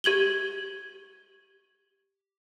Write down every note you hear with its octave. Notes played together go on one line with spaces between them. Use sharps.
G4 G#6 F#7 G7